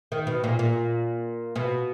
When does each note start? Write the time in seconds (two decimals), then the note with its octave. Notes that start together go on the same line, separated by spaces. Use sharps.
0.12 D#3
0.27 B2
0.44 A#2
0.59 A#2
1.56 B2